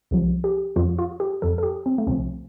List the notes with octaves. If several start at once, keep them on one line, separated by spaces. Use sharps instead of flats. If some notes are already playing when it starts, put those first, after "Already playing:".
C2 C3 F3
G4
F2 F3 F4
F4
G4
F2 F3 A4
A4
G4
C4
A3
C2 C3 F3 C4